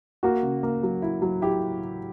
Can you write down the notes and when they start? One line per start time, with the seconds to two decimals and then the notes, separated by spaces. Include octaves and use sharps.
0.23 A#3 F#4
0.43 C#3
0.63 A#3
0.83 F#3
1.02 E4
1.22 F#3
1.42 E4 G4